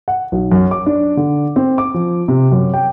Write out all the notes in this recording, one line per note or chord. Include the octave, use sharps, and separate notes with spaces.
F#5
B1
F#2
D6
D4
D3
C4
D6
F3
C3
F#2
G5